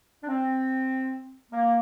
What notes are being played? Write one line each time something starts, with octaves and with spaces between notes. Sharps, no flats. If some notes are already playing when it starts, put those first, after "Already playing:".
D4
C4
A#3